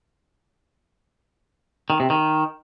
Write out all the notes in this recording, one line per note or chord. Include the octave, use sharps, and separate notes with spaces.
D#3
C3
D#3